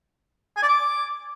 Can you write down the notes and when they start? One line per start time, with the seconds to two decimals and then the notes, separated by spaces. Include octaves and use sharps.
0.57 G#5
0.63 D5
0.69 D6